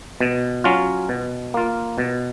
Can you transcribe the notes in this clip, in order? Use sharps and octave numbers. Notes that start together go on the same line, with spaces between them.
B2
F#3 C#4 F4
B2
A#3 F4
B2